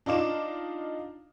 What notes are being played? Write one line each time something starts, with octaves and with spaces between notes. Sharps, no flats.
D4 D#4 F4 D6 E7